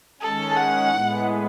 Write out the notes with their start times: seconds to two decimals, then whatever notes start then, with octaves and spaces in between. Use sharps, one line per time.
0.21 D#3 G#3 C#4 A4
0.56 F#5
0.91 A2 G#3 B3